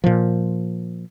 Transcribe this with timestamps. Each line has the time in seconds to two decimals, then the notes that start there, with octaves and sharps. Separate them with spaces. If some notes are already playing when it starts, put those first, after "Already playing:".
0.04 A#2 F3